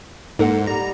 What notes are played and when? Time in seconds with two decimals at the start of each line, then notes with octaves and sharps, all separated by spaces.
0.39 G#2 A#3 D#4 A4 F#5
0.67 G3 A#5